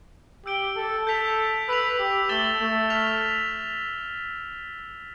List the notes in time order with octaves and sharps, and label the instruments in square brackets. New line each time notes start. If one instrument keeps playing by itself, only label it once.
[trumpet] G4 [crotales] E6 G6 D7 G7
[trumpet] A4
[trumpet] A4 [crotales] G6 B6 F7
[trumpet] B4 [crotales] E6 B6 F7
[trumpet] G4
[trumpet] A3 [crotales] E6 A6 E7 G7
[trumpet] A3
[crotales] F6 B6 F7